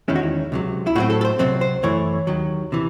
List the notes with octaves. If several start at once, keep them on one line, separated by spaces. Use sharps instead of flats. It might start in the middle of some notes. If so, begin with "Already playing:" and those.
E2 D#3 G#3 C#4 E4
F#4
E4
C#2 C3 F#3
E4
A2 F#3 C4 F#4
A4
A4
C5
C#2 C3 F#3 C4 C5
C5
F#2 E3 A3 C#5
D#2 D#3 F#3
C3 E3